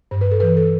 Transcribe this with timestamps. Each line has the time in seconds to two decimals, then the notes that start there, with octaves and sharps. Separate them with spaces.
0.11 G2 C5
0.21 B4
0.31 A4
0.40 E3 B4
0.57 A4